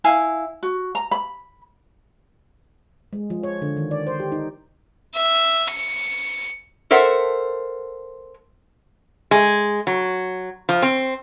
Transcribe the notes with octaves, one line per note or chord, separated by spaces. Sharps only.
E4 F5 G#5
F#4
A#5
B5
G#3
F3
C#5
D3
D#3
D5
C5
G4
D#4
E5
C#7
A4 A#4 C5 E5 F#5
G#3
F#3
F3
C4